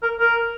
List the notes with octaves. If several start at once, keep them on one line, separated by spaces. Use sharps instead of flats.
A#4
A#4